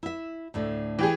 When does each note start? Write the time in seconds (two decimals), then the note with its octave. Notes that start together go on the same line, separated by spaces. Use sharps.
0.03 E4 E5
0.54 D2 A2 D3
0.99 E3 G4 G#4